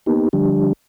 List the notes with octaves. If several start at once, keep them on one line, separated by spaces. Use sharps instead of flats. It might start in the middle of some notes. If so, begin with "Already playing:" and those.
A#3 B3 D#4 G4
D3 F3 G3 D4 G4